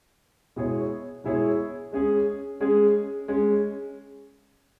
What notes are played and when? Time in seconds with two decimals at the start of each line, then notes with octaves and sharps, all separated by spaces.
0.56 B2 G#3 E4 G#4 C#5
1.24 B2 G#3 E4 G#4 C#5
1.92 G#3 C#4 G#4
2.60 G#3 C#4 G#4
3.28 G#3 C#4